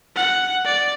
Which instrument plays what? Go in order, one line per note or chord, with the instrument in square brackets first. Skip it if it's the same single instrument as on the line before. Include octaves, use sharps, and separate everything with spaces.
[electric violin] F#5
D5